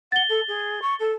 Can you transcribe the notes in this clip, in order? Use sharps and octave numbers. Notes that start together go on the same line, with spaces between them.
F#5 A6 G7
A4
G#4
C#6
A4